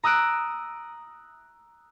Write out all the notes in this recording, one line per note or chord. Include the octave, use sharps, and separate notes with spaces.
A#5 D#6 E6 F#6 D7